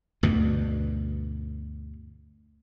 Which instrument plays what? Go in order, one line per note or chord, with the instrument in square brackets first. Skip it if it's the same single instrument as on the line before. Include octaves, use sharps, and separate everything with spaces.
[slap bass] D2 G2 B2